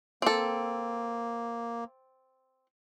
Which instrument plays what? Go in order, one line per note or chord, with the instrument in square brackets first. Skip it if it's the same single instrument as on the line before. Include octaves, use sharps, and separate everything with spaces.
[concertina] A#3 [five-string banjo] C4 A4